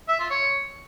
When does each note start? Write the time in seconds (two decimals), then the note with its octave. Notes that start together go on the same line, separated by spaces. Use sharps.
0.09 E5
0.19 F4
0.30 C#5